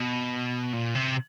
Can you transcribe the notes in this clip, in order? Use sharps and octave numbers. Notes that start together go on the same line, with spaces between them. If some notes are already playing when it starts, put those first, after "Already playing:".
Already playing: B2
A#2
C3